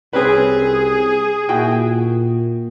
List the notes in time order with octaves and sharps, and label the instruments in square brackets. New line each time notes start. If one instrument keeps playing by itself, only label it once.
[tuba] C2 [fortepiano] C4 C#4 B4 [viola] G#4
[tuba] A#2 [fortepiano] E4 F#4 G5